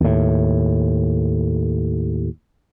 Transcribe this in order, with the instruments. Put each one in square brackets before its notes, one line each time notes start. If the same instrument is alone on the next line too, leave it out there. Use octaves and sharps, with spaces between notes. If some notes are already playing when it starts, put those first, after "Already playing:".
[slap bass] D#2 A2